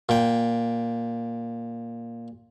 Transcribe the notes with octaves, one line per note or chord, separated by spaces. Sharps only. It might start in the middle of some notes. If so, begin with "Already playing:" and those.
A#2 G5